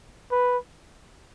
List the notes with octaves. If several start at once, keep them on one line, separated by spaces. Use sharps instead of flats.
B4